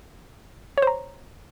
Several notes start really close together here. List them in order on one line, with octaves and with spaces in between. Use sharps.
C#5 C5 A#5